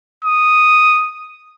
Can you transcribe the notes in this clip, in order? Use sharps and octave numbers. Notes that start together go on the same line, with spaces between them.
D#6